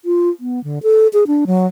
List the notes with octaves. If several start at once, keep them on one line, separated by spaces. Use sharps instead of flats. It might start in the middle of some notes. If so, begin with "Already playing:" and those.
F4
B3
D3
A4
G#4
D4
F#3